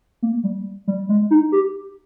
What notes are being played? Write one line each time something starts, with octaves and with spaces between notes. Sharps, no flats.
A#3
G3
G3
G#3
D#4
G4